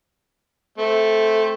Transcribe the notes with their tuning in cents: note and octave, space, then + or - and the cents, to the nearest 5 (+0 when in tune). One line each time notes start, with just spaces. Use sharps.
A3 -5 C4 +0